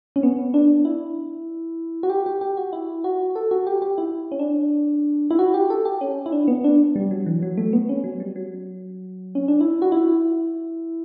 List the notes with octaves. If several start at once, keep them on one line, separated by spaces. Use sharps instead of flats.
C#4
B3
D4
E4
F#4
G4
G4
G4
F#4
E4
F#4
A4
F#4
G4
G4
E4
C#4
D4
E4
F#4
G4
A4
G4
C#4
E4
D4
B3
D4
G3
F#3
E3
F#3
A3
B3
C#4
F#3
G3
F#3
C#4
D4
E4
F#4
E4